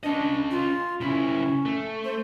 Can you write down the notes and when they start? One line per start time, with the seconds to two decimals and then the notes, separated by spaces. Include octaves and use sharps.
0.03 C#4 D4 D#5
0.51 F4
1.01 C#3 C#4 E4
1.66 A3
2.04 C5